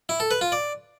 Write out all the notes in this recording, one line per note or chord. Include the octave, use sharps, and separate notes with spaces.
E4
A4
B4
F4
D5